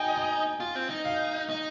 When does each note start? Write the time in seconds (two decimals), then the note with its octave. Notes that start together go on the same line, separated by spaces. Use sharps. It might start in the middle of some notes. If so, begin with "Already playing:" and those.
Already playing: D#4 G5 G#5
0.16 G#5
0.60 F4
0.75 C4
0.89 D#4
1.05 F5
1.49 D#4